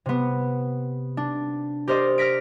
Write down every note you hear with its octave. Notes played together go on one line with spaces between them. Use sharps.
C3 B3
D4
G4 A#4 C5 D5 D#5
F6 A#6 B6 D7